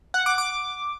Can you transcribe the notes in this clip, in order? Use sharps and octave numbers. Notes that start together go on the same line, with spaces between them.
F#5
D6
D6